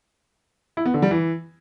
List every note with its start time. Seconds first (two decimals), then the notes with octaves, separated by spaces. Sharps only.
0.77 E4
0.85 B3
0.94 D3
1.02 G3
1.11 E3